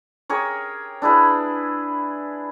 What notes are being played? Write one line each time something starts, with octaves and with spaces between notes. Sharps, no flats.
G4 G#4 A#4 C#5
D4 E4 G#4 B4